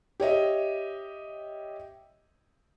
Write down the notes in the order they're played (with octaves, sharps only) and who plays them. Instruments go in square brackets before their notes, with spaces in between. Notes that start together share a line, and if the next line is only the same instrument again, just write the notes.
[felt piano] G4 C#5 D#5 E5